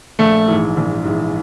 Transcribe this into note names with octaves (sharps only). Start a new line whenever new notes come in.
A#1 A3
G#2 E3
A#1
G#2 E3